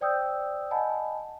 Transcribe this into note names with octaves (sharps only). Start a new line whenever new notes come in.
C5 D5 G5 D#6 E6 G6
D#5 F#5 G#5 A5 B5